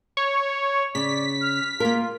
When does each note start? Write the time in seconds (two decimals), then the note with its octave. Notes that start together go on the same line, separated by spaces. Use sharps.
0.17 C#5
0.95 C#3 D5 B6
1.42 F6
1.80 A#3 F4 A#4